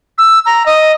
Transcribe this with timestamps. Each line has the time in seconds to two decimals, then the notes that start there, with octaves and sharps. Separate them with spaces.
0.18 E6
0.46 A#5
0.66 D#5